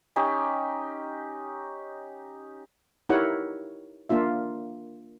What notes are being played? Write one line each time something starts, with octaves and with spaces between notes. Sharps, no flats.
C#4 D#4 G4
D#4 E4 G4 A#4 C#5 F#5
A#3 D4 F4 E5